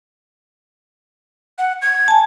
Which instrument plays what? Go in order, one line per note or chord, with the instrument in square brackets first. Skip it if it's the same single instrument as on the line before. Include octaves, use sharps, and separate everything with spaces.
[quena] F#5
G#6
[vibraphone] G#5 A5